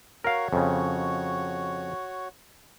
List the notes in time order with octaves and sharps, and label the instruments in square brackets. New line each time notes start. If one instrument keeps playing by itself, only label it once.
[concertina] F#4 C#5 [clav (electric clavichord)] A#4 F5
[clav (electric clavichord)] F2 C#3